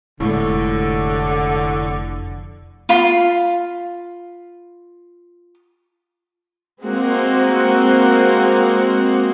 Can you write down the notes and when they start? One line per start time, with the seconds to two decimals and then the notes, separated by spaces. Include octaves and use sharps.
0.20 F1 A2 D3 G#3
2.89 F4 F5 B5 C6
6.82 G#3 A#3 C4 F#4